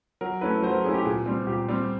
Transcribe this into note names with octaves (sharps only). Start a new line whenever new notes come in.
F#3 A#4
A3 C#4 E4 B4
F#3 C5
A#4
A3 C#4 E4 G#4
G4
A#2 G#4
G3 C4
A#2 G4
G3 C4